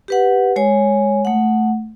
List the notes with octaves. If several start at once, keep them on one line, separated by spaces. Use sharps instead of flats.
G4 B4 F#5
G#3 C#5 G#5
A3 F#5